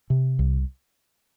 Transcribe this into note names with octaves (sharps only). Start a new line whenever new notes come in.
C3
C2